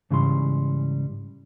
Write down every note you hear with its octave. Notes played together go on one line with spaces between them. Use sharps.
G#2 C#3 E3 G3 C6